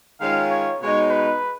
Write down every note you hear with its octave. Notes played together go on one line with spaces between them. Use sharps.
D#3 G#3 C#4 F4 F5
C#5
B2 G#3 D#4 C#5
B4